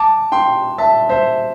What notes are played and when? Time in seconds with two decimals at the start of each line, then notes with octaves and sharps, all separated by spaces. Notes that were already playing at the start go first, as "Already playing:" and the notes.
Already playing: A5 D6
0.32 G5 C6
0.78 E5 A5
1.09 C5 E5